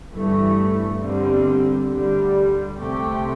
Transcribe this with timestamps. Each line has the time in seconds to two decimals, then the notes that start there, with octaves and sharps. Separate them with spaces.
0.12 G1 G2 E3 A3
1.00 G1 G2 D3 G3 C4
1.89 D2 D3 G3
2.77 C2 C3 A3 C4 G4